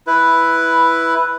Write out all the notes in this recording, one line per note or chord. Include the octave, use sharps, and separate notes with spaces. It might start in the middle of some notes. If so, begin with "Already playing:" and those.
E4 B4